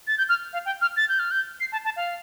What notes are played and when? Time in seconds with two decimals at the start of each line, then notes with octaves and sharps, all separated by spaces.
0.07 A6
0.18 G6
0.29 F6
0.53 F5
0.66 G5
0.82 F6
0.97 A6
1.09 G6
1.19 F6
1.31 G6
1.60 C7
1.72 A5
1.85 A5
1.97 F5